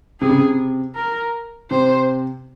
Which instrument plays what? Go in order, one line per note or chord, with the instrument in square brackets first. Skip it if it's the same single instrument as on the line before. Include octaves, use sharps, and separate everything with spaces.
[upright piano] C3 [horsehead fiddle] G#4
[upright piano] C#3
C3
[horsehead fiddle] A#4
[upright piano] C3 [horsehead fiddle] C5